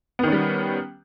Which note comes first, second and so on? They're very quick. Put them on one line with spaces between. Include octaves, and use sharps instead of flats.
B3 D#3 C#4 G3